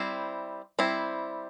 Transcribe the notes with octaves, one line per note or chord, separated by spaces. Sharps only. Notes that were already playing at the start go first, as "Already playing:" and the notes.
Already playing: G3 C4 E4
G3 C4 E4